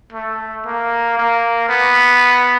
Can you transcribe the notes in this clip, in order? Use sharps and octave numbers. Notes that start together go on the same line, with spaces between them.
A3
A#3
A#3
B3